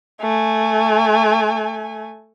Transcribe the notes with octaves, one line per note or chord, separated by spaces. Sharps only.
A3 G#5